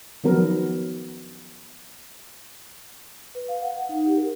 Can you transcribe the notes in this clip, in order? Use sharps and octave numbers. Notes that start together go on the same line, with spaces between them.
D#3 F3 F#3 B3 A#4
B4
F5
F#5
F#5
D#4
G4
A#4